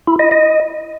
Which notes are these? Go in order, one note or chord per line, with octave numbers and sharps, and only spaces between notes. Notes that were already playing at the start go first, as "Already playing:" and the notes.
E4
D#5
D#5